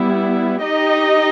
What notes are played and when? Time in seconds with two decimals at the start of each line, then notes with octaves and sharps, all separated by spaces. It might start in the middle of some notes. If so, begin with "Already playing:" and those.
Already playing: G3 B3 E4
0.63 D#4 G4 D#5